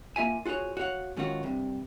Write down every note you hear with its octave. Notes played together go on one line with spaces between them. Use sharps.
A#3 F4 E5 G#5
F4 F#4 G#4 C5 C#5
F#4 C#5 F5 F#5
G#2 D#3 C#4 F4 F#4
G2 C3